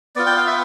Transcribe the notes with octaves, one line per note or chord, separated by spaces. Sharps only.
B3 F4 D5
G5
F5
E5